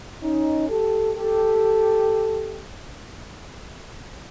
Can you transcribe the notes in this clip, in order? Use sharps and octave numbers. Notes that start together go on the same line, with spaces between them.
C#4 D#4
G4 A4
G4 A4